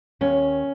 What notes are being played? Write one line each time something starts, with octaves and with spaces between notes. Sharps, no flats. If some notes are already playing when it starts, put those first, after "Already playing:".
D#2 C#4